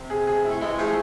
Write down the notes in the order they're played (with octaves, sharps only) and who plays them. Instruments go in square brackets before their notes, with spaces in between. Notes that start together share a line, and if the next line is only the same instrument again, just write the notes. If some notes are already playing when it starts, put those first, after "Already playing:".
Already playing: [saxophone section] C3
[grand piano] G#4
G#4
E4
[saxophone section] A3
[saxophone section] E3 G#3 [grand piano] E4
[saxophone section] F3 A3 [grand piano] G#4